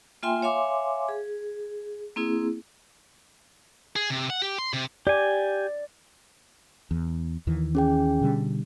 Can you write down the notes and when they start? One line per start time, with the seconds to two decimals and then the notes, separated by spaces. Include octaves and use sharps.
0.23 A#3 F4 E5 G5 G#5 C6
0.42 C#5 E5 F5 G#5 C6 D6
1.09 G#4
2.16 A#3 C4 E4 G#4
3.96 G#4
4.10 C3
4.30 F#5
4.42 G4
4.58 C6
4.73 C3
5.07 G4 D5 G#5
6.91 E2
7.47 D#2 D#3 E3
7.75 C#4 G#4 G5
8.21 B2 D3 G3